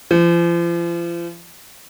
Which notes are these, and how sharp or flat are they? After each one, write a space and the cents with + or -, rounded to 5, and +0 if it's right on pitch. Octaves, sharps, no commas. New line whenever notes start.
F3 -40